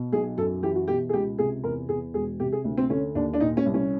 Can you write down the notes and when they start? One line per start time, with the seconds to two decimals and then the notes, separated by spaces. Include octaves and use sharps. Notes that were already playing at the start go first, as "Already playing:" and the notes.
Already playing: B2
0.12 B1 G#4
0.37 F#2 A4
0.62 E3 G4
0.76 F#4
0.88 B2 G4
1.09 G#4
1.13 C#2 G4
1.39 C3 G#4
1.64 E2 A#4
1.89 E2 G#4
2.14 E1 G#4
2.40 C3 G4
2.53 G#4
2.64 D2
2.77 C4
2.90 D3 C#4
3.15 D#2 D4
3.34 D4
3.40 A#2 D#4
3.57 C#4
3.66 C2
3.74 C#4